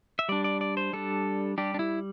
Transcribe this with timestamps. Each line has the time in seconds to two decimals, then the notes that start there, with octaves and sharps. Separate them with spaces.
0.19 E5
0.29 G3 D4 D5
0.44 D5
0.61 D5
0.77 C5
0.93 G3 D4 A4
1.58 G3 D4 G4
1.74 D4
1.79 E4